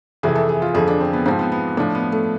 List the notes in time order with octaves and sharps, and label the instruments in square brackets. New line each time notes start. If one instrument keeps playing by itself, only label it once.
[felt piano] F2 C3 E3 G#4
A4
G#4
F4
F2 D3 F3 G#4
D4
C4
B3
G#2 F3 C4
B3
B3
A2 F3 D4
B3
A3